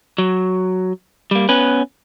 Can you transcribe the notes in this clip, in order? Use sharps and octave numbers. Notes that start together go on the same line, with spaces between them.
F#3
G3 A#3
B3 C#4 B4